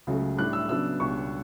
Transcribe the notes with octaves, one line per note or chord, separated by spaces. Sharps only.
C#2 C#3 F#3 A3
A2 G3 D4 F#6
E6
C#3 F#3 B3 D4 E6
C#2 B2 G3 D4 C#6